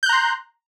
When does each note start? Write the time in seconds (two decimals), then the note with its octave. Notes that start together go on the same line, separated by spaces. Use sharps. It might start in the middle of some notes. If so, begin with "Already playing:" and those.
0.03 G6
0.06 F#6
0.09 A#5
0.13 C6